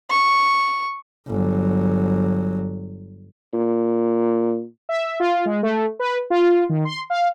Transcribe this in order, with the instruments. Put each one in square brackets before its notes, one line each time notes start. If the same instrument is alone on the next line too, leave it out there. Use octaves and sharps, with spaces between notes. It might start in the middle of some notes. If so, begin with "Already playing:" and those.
[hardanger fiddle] C#6
[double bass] G1 F#3
[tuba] A#2
[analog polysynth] E5
F4
G#3
A3
B4
F4
D#3
C6
F5